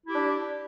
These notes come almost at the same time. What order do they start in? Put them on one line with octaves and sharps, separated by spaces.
E4 G4 D4